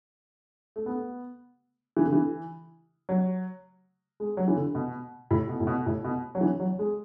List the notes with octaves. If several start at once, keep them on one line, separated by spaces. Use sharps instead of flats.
A3
B3
E3
D3
E3
F#3
G#3
F#3
E3
D3
B2
A2
B2
A2
B2
A2
B2
F#3
E3
F#3
G#3